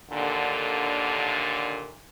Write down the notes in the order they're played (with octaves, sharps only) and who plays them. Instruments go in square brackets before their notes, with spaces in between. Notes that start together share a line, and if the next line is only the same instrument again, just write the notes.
[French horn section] D#2 A#2 D3